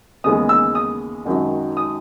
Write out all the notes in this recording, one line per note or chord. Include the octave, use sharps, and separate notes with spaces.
D#2 C#3 E3 G#3 B3 D#6
E6
D#6
G#1 F#2 D#3 F#3
D#6